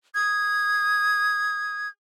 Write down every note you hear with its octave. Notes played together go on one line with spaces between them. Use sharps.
D#6 G#6